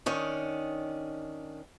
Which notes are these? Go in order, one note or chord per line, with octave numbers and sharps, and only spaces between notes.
D#3 C#4 D4